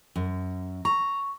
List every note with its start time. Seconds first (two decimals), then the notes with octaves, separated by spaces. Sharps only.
0.16 F#2
0.85 A#5 C#6